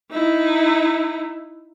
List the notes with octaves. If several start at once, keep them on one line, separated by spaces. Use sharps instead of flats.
D#4 E4